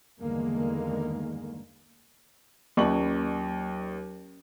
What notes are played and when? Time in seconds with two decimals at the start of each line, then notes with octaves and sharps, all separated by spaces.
0.20 E2 G2 D3 D#3 G#3 A#3
2.77 D#2 F#3 C#4 C#6 F#7